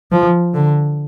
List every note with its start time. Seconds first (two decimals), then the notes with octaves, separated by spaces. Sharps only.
0.12 F3
0.54 D3